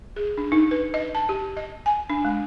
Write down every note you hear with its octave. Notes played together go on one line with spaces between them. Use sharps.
G#4
D4
D#4
B4
D#5
A5
G4
D#5
G#5
D4
G#3